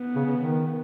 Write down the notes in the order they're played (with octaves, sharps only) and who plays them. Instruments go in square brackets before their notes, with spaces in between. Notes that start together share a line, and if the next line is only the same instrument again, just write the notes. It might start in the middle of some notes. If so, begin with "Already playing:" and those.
Already playing: [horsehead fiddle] B3
[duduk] C#3
C#3
D#3